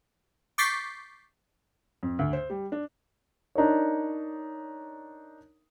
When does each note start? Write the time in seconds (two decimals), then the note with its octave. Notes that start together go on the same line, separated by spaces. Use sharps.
0.58 C#6 D6 G6 A6 B6 C7
2.03 F2
2.19 D2
2.33 C5
2.50 G3
2.72 D4
3.55 D4 D#4 A#4 C#5